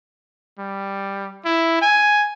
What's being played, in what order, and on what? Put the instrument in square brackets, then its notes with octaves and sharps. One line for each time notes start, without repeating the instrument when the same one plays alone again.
[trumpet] G3
E4
G#5